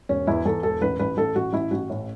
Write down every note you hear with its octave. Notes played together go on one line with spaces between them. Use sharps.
E1 C#4
E2 E4
E2 A4
E1 A4
A1 B4
A1 B4
A1 A4
A1 F#4
A1 E4
A1 F#4
A2